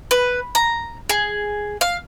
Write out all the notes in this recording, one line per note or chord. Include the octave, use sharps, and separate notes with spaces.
B4
A#5
G#4
F5